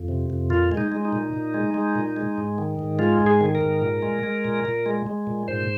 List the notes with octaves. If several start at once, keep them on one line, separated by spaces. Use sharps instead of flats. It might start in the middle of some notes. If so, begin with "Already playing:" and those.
Already playing: F2
C3
F2
A#2 F4
G#3
D#4
G#3
D#4
A#2
A#2
G#3
G#3
A#2
G#3
G#2
D#3
G#2
G#3 F4
G#2
G#4
D#3
A#4
G#2
A#2
G#3
G#3
A#2
A#2
G#3
G#3
A#2
G#2 C5